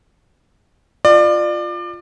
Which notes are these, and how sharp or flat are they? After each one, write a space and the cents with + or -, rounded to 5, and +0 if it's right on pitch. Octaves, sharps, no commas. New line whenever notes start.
F4 +0 D5 +30